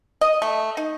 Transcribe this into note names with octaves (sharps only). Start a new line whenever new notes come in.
D#5
A3
D#4